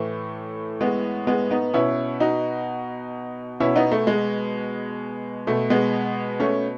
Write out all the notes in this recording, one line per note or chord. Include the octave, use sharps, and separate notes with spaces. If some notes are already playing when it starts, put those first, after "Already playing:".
Already playing: A2 E3 A3
G#3 B3
G#3 B3
B3 D#4
B2 C#4 E4
D#4 F#4
B2 C#4 E4
B3 D#4
A3
G#3
B2 A3
G#3 B3
A3 C#4